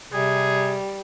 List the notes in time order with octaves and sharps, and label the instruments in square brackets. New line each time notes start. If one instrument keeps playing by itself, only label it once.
[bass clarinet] C3 [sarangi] G3 [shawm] G#4